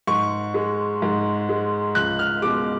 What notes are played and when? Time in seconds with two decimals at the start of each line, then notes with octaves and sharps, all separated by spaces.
0.07 G#2 C#6
0.54 G#3
1.02 G#2
1.49 G#3
1.95 C#2 F#6
2.19 F6
2.42 B2 G#3 D6